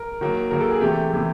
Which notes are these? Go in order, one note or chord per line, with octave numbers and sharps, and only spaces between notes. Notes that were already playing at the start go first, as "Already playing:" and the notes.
Already playing: A#4
D#3 F#3 A#3
D#3 F#3 A#3 A#4
A4
G#4
C3 E3 A3 G4
C3 E3 A3